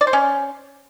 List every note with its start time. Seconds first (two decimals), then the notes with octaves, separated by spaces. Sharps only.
0.01 D5
0.07 C5
0.13 C#4